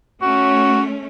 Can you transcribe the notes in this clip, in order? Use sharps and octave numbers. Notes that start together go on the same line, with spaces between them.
A3 C#4 F#4